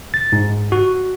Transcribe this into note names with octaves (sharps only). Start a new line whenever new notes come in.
A6
G#2
F#4